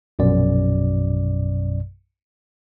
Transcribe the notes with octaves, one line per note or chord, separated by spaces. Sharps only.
A#1 F#2 B2 D5